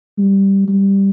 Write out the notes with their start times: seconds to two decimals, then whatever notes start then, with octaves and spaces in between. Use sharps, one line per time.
0.18 G3
0.68 G3